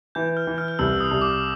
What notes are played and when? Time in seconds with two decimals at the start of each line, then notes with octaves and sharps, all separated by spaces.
0.15 E3 G6
0.37 F6
0.47 E3
0.58 F6
0.68 F6
0.79 C2 E6
1.00 D#6
1.11 C2
1.22 D6